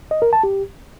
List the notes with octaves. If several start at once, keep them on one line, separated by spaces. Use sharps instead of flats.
D#5
A#4
A5
G4